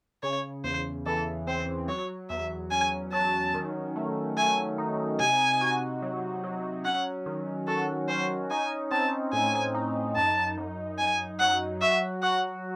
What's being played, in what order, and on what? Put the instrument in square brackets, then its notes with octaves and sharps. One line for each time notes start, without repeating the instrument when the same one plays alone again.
[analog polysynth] C#3 [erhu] C#5
[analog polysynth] E2 [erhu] C5
[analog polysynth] E3 [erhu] A4
[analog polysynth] C4 [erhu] C5
[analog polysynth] F#3 [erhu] C#5
[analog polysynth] E2 [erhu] E5
[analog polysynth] C#4 [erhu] G#5
[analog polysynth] F#3 [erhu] A5
[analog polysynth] D#3
A3
[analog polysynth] A3 [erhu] G#5
[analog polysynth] D#4
[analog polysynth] C3 [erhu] G#5
[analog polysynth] F#4
F#3
F#3
[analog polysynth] C#4 [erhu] F#5
[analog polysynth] D#3
[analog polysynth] F#4 [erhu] A4
[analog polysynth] C#4 [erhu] C5
[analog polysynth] D#4 [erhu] G#5
[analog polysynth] C4 [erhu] A5
[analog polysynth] A2 [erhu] G#5
[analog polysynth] D#4
[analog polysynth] F#2 [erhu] A5
[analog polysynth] F#2
[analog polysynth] F#2 [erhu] G#5
[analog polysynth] F#3 [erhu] F#5
[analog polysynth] F#4 [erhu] E5
[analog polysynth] F#4 [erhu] F#5